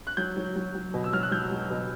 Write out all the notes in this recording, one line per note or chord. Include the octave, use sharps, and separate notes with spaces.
F#6
F#3 G6
F#3
F#3
F#3
B2
E6
F#3 F6
F#6
F#3 G6
F#3
B2